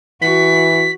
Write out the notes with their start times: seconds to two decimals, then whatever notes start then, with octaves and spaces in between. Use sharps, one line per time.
0.22 E3 F#4 B6